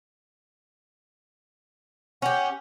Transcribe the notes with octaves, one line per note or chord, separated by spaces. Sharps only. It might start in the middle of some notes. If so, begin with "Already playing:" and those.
C#4 G4 F#5